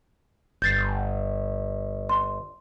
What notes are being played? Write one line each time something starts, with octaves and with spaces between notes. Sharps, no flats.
G1 G6 A6 C7
C6